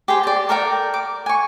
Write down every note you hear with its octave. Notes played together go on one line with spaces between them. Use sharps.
G4 G#4 C5
D5 A5
A4 A#4 D5 G5
D6
G#5 C#6